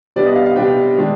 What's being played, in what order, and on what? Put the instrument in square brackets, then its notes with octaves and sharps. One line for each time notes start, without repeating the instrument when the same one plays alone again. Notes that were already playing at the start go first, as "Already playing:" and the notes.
[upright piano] C3 G3 B3 D4 D5
D#5
F5
F5
C3 G3 B3 D4 G5
D#3 G#3 D4